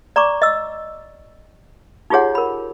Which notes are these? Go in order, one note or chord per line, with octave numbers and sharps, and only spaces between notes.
D5 A#5 C#6 D6
D#5 E6
D#4 F4 G4 G#4 C#5 F#5
A#4 B5